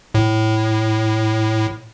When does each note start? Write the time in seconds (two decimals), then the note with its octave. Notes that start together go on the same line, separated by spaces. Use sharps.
0.15 A2